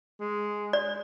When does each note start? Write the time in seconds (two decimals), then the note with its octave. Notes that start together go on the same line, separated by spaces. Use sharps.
0.20 G#3
0.73 D5